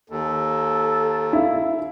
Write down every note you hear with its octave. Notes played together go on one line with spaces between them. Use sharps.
D#2 A4
E4 F5